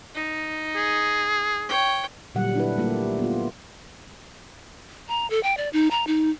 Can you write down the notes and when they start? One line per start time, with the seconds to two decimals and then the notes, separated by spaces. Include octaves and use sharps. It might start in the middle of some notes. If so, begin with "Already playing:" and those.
0.14 D#4
0.75 G#4
1.68 C#5 G5
2.35 A#2 D3 F#3 G3 F#5
2.55 D4 E4 B4
2.77 G3 A3 A#3 F4 G4
3.19 B3 F4
5.08 A#5
5.30 A4
5.43 G5
5.57 D5
5.73 D#4
5.91 A#5
6.07 D#4